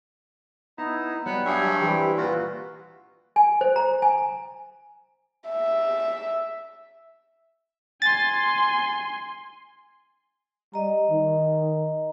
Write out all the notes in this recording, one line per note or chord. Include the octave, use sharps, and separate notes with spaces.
B3 D#4 E4
F#3 G3 B3
G2 G#4 C#5 E5
E3 G3 C4 E4 G4
A#2 F4 F#4 B4
G#5
C5
A#5
G#5
E5
G#5 C6 A6
G3 D#5 A#5
D#3